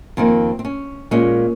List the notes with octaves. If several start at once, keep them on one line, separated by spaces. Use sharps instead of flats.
F2 D#3 A#3 C4
C4
C#4
A#2 G#3 C#4